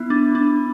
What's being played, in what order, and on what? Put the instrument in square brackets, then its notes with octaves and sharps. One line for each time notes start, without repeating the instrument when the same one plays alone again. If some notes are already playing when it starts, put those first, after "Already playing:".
Already playing: [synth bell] B3 [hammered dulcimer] E4
[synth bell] D4
D4